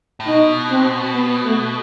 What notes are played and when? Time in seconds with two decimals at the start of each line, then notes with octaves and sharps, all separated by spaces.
0.20 A2
0.27 B2 D#4
0.71 C4
1.14 B3
1.44 A3